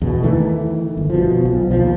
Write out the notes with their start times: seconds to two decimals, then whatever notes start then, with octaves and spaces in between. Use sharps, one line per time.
0.02 E2 B2
0.23 D#3 E3 A3
0.97 G1
1.10 B2 F3
1.45 B1 F3
1.71 D#2 F3